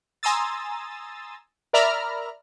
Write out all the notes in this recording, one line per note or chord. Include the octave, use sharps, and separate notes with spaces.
G#5 A#5 C6 D#6 E6 A6
A#4 D5 E5 A#5 B5 F6